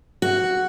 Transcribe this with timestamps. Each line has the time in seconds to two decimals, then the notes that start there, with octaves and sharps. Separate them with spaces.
0.22 F#4